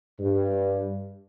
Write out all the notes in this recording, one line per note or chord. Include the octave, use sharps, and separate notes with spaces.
G2